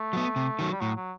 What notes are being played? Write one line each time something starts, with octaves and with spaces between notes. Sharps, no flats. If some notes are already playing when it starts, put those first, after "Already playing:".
Already playing: A3
F#3 B3
C3
D#3 F#3
G3
A2 F#3
F#3